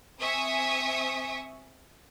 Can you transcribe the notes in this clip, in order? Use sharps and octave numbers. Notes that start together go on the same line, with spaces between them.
C4 E5 G#5 C#6 D#6